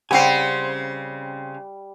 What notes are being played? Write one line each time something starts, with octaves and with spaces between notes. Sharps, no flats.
C#3 G3 C4 F5 F#5 G#5